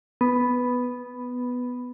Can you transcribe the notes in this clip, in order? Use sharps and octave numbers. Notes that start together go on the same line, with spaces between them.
B3